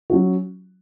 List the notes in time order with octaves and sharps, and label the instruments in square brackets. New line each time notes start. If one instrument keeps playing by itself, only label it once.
[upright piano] F#3 C#4 F#4